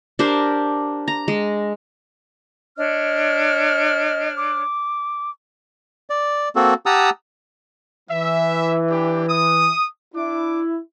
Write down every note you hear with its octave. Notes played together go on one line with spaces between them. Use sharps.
D4 G4 A#4 C5
A#5
G#3
D4 C#5 D#5 F6
D6
D5
A#3 C4 F#4 A4
G4 F#5 A5 A#5 D#6 E6
E3 E5
D4 E4 G4
D#6
D4 E4 D6